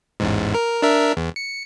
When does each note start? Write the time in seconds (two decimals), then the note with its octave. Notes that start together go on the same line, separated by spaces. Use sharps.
0.20 A1 E2 G#2
0.54 A#4
0.82 D4 A#4 E5
1.17 E2
1.36 C#7